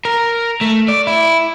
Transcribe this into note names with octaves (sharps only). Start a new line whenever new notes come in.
A#4
A3
D5
E4